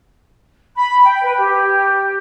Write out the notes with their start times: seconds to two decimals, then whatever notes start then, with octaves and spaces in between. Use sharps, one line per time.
0.76 B5
1.04 G5
1.22 B4
1.37 G4